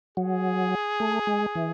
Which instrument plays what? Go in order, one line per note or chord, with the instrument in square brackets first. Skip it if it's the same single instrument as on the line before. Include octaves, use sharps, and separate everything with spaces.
[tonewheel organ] F#3 [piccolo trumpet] G#4
[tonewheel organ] A3
G#3
E3